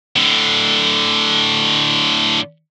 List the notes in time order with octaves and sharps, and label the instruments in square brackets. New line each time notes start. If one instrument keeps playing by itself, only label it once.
[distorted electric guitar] A2 D3